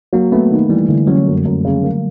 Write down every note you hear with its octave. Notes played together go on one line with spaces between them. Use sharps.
F#3 A#3
A3 B3
D#3
E3 G3
D3 E3
F#3 C#4
F#2
F#2
C#3
A#3